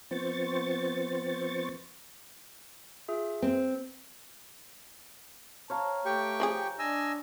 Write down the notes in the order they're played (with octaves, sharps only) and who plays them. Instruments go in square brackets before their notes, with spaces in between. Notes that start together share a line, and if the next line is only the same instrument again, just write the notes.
[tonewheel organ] F3 B3 C4 C5 C#6 A6
[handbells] F4 G#4 E5
[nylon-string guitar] C4
[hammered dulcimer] C#5 F5 A#5 [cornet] A5
[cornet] A3 [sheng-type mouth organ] G4 G5 C#6
[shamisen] F3 F#4 G#4
[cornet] D4 [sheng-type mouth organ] D#5 G#5 E6